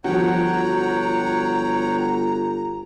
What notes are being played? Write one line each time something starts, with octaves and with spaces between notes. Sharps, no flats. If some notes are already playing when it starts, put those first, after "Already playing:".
G1 F3 F#4 C#5 F#5 G5 A#5